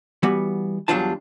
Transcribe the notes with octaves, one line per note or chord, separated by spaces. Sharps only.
E3 G3 B3 F#4
E2 F#3 G3 D4 F4 A5